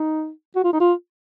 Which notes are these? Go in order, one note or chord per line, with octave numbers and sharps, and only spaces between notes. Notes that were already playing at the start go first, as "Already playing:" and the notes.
Already playing: D#4
F#4
F4
D#4
F4